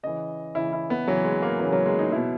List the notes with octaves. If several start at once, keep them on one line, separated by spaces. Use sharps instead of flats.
C#3 E3 D#5
C#3 E3 E4
E4
B3
C#3 E3 F#3
G#3
A#3
C#3 E3 F#3
F#3
G#3
D#4
B2 F#3 E4